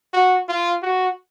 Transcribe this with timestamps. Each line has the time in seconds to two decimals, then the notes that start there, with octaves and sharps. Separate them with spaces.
0.13 F#4
0.49 F4
0.82 F#4